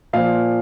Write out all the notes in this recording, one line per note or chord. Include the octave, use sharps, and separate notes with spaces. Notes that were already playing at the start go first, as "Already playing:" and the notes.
A#2 F3 F5